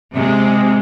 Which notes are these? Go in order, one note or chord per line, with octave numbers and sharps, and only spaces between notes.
C3 G#3